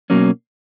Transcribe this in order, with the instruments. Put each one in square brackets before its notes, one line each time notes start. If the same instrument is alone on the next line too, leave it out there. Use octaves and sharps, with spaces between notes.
[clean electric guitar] B2 F#3 A#3 C#4